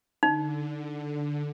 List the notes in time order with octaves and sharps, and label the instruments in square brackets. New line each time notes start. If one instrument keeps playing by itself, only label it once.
[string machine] D3 [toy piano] D#4